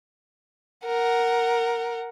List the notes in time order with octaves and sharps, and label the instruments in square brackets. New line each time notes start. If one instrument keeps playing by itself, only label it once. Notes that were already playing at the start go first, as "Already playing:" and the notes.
[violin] A#4 F#5